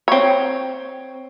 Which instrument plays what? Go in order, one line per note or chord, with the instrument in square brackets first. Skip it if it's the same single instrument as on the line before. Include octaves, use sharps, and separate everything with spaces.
[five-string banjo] C4 C#5